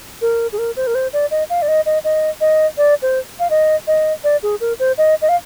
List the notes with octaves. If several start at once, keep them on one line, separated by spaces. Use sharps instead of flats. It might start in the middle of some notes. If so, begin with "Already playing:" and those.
A#4
G#4
A#4
C5
A#4
C5
D5
D#5
F5
D5
D#5
D#5
D#5
D#5
D5
C5
F5
D#5
D#5
D5
G#4
A#4
C5
D#5
D#5
F5